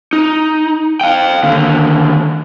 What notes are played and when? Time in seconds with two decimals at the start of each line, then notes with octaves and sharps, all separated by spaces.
0.13 D#4
1.01 F5 G5
1.44 D#2 D3